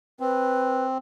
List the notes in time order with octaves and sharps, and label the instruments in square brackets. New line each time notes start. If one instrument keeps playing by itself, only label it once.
[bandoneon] C4 [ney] B4